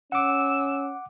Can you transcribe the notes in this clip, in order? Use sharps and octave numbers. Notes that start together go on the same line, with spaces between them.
C#4 F#5 D6 E6